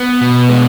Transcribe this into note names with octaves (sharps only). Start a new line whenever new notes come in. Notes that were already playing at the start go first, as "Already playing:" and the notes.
Already playing: B3
B2
G#3